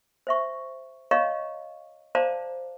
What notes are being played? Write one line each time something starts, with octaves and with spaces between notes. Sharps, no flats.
C5 E5 C#6
C#5 D#5 F5 A#5 C#6
C5 D5 F5 A5 A#5 D6